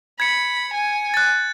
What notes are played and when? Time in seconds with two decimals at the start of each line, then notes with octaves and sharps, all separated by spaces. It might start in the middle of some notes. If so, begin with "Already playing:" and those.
0.20 B5 G#6 C#7
0.74 G#5
1.14 F#6 A6